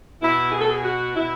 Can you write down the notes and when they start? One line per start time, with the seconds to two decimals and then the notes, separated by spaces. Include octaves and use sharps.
0.21 B2 E4
0.52 G#4
0.60 A4
0.67 G#4
0.83 F#4
1.15 B2 E4